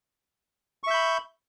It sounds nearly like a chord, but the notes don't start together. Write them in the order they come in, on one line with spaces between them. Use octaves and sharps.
C#6 E5 G6 B5